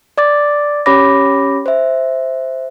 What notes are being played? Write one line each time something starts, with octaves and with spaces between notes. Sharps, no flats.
D5 D6 A6
C#4 G4 C#5 B5 D6 A#6
C5 E5